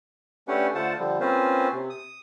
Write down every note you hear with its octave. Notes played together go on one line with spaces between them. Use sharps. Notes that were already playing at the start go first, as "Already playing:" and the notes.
A3 C#4 D4 G4 B4 F#5
D3 A3 F4 C5 F#5 A5
D3 F3 G3
A#3 C4 C#4 F4 B4 C5
C3
D#6